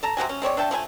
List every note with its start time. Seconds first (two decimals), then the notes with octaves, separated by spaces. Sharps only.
0.03 A4 A5 A#5
0.17 C3 C4 F#4 G#5
0.29 C#4
0.42 G#3 C4 C#5 D5
0.57 D4 E5 G5 A5
0.71 F3 A3 B4 G#5